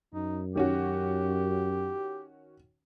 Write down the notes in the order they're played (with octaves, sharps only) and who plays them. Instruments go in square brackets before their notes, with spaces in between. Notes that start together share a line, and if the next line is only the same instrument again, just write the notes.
[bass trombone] F#2 [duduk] D#4
[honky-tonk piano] D#3 C#4 F#4 [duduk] G4